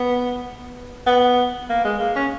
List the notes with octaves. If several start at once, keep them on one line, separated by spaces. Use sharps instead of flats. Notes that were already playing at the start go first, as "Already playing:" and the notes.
Already playing: B3
B3
A#3
G#3
A#3
C#4